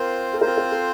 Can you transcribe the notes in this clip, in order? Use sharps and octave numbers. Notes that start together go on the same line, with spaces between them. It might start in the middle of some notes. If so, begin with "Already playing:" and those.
Already playing: C4 F4 A#4 C5
A4
C4 F4 A#4 C5
A#4
A4